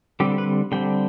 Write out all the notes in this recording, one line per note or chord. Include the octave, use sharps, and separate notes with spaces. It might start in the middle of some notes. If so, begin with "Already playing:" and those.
D3 G3 C4 G4
B4
D3 G3 C4 G5